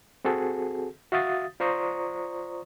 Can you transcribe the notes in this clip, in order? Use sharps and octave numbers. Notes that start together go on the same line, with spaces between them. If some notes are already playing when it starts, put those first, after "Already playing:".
C4 F#4 G#4 A4
F#4 E5 F5 D#6 A6
F4 C5 D5 A#5 C#6 D#6